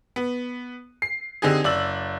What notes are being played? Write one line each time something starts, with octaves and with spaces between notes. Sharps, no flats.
B3
C7
D3 C4 D#4 G4 G#4
F#1 D5 E6 F#7